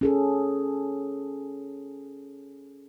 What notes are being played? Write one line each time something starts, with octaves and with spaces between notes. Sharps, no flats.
C#4 G#4 A4